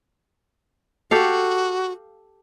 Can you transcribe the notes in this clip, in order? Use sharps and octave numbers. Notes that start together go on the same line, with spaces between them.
F#4 G4 A4 F5